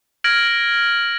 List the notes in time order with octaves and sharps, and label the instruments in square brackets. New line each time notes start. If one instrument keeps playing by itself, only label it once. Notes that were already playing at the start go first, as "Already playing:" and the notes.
[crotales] F6 G#6 A#6 D7 F#7